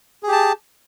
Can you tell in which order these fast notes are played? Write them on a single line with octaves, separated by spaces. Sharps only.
G#4 G4 A5